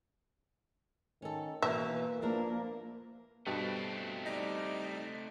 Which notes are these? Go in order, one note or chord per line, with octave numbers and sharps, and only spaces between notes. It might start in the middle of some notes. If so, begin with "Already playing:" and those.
D#3 C#4 A4
B2 E3 A#3 E5
F3 A#3 D4 E4 A#4
G2 B2 A3 C4
G3 D#4